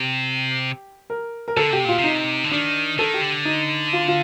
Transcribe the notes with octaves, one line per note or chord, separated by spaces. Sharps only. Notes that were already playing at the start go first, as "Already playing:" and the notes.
Already playing: C3 G4
A#4
A#4
D3 A4
C3 G4
A#2 F4
C3
D#4
D3
D#3 D4
D#3 A4
G4
D3
D#4
F4
F4